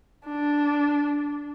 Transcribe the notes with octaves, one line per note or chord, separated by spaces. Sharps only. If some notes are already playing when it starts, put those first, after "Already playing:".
D4